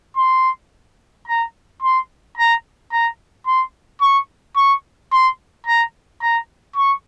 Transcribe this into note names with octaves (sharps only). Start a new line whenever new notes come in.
C6
A#5
C6
A#5
A#5
C6
C#6
C#6
C6
A#5
A#5
C#6